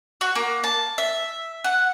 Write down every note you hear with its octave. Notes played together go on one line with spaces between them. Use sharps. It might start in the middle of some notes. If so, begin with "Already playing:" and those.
F#4
A#3
A5
E5
F#5